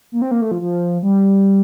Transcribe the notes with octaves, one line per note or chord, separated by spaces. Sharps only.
A#3
C4
A#3
A3
F3
F3
G3